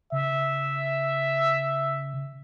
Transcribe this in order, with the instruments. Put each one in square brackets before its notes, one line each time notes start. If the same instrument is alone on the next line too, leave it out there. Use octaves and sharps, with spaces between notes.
[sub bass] C#3 [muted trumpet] E5